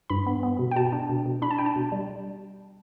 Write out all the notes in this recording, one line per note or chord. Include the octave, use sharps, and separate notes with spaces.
G2 B5
B3
B3
B2
G5
B2 A5
D4
B2
B2
D4 B5
A5
D4 G5
A5
B2
G3